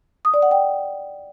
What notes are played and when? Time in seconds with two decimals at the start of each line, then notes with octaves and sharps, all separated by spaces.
0.25 D#6
0.34 D5
0.42 F#5
0.51 G5